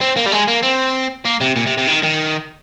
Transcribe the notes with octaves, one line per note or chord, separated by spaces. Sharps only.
C4
A#3
G3
G#3
A#3
C4
A#3
C3
A#2
C3
C3
D#3
D#3